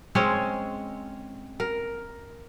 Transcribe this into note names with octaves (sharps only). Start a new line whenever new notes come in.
G#3 C4 C#4 C#5
A#4